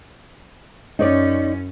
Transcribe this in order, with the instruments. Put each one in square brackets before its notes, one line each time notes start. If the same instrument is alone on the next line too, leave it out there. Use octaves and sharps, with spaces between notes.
[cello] F#2 C#4 [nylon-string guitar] D#4 C#5 D5